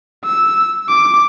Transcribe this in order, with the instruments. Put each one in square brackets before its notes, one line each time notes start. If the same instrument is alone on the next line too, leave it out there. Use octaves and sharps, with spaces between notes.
[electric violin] E6
D6